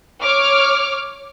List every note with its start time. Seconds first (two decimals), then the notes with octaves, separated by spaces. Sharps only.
0.22 C#5 D6 F6